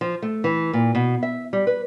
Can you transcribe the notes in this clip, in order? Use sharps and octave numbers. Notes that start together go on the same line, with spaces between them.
F3
A3
E3
A#2
B2
E5
G3
B4